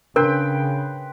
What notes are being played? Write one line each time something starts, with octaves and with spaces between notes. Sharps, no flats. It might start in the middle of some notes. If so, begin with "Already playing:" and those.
C#3 D4 A#4 B4 G5 C6